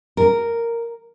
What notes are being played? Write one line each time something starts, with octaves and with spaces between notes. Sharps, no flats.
A#4